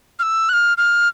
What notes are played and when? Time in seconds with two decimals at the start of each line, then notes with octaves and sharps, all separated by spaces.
0.19 F6
0.23 E6
0.49 F#6
0.53 F6
0.78 F6